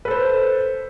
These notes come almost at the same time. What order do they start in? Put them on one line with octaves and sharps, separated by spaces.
B4 A4 C5